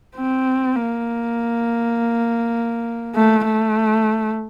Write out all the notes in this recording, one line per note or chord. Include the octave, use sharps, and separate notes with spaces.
C4
A#3
A3
A3